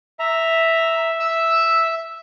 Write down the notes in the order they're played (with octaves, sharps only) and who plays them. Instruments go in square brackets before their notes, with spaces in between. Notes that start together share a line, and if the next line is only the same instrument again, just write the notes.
[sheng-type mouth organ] E5 [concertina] A#5
[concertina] E5 [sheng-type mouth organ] E6